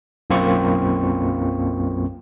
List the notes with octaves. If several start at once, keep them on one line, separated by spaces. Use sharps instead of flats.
B1 F#2 A#3 C4 F4 C#6